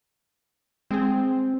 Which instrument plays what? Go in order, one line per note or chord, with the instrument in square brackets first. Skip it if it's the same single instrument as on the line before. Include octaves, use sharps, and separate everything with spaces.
[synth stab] G#3 G#4 [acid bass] C4